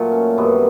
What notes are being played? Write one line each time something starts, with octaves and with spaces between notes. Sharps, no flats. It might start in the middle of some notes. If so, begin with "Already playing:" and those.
Already playing: A#2 F#3 A3
C#4
F#2 D#3 G3 B3